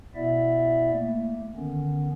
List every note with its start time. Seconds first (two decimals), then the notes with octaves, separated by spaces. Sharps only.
0.15 B2 B3 E4 D5 E5
0.92 A3 A#3
1.56 D3 D#3 B3 C#4